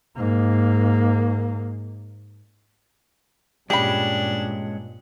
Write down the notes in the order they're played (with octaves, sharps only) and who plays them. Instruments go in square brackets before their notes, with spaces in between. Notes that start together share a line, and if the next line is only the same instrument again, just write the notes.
[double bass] G#2 A#3
[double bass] G2 A#2 [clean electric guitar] G#3 C#4 [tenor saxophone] D4 [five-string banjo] G4 B5